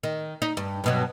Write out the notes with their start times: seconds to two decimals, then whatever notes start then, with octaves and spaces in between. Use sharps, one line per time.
0.03 D#3
0.42 D#4
0.57 G2
0.84 G2 B2 F#3